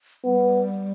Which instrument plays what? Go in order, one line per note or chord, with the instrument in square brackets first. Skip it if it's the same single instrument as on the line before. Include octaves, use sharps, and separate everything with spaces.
[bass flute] G3 [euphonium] B3